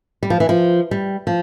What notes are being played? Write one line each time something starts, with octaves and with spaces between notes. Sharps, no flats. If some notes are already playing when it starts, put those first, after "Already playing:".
G3
F3
E3
F3
G3
F3